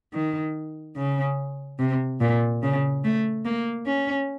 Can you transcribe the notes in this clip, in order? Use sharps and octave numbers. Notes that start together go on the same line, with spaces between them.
D#3
C#3
C3
A#2
C#3
A3
A#3
C#4